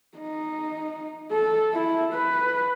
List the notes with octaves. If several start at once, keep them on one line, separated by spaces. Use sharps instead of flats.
D#4
A4
E4
B4